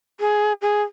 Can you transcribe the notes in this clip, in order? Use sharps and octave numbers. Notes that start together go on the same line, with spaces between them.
G#4
G#4